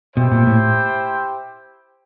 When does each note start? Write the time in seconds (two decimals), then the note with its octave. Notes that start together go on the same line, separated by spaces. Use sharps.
0.16 B2 E4 G4 C5 E5 G5
0.32 A#2
0.46 A2